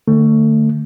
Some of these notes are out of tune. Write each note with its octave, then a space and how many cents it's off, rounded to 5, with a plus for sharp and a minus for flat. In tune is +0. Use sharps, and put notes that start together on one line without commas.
D3 +35 A3 +25